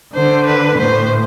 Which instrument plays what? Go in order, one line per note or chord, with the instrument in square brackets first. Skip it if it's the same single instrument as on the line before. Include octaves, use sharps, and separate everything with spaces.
[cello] D3 [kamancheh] C5
[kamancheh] B4
[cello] A2 [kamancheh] C5